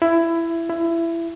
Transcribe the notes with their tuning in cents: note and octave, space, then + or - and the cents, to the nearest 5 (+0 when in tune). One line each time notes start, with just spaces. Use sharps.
E4 +15
E4 +20